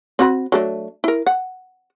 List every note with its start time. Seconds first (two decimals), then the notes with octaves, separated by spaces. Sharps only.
0.19 C4 F#4 B5
0.52 F#3 A3 D4
1.04 E4 A#4
1.26 F#5